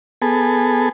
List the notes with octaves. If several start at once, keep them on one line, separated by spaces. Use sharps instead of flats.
B3 G#4 A4